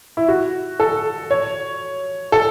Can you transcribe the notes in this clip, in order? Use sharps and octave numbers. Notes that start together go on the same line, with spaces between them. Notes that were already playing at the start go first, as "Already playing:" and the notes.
E4
F#4
A4
C#5
A4